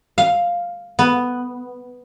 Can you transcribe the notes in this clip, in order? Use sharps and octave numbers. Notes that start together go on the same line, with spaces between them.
F5
B3